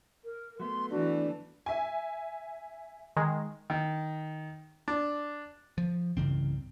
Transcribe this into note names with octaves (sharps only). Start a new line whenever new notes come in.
A#4
F#3 A3 B3 C6
E3 D4 F#4
E5 G#5
D#3 G#3
D#3
D4
F3
C2 G2 C#3 E3 C4